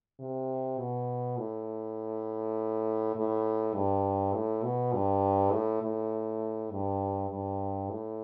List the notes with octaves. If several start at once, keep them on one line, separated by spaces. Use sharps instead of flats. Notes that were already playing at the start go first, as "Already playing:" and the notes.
C3
B2
A2
A2
G2
A2
B2
G2
A2
A2
G2
G2
A2